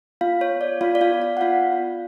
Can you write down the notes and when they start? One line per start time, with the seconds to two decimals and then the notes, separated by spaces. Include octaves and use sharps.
0.21 B3 F4 F5
0.41 C#5
0.51 B3
0.61 D5
0.81 B3 F4 F5
0.95 D5
1.01 F4 F5
1.12 F4
1.22 D5
1.37 F#5
1.41 B3 F4 F5
1.72 F4